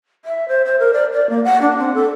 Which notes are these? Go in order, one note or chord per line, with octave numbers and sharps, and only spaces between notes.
E5
C5
C5
A#4
D5
D5
A#3
F#5
D4
C4
A4